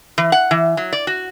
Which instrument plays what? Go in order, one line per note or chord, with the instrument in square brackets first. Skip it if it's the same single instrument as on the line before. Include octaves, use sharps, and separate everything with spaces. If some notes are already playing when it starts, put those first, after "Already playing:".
[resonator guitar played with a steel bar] E3
F#5
E3
F#3
D5
F#4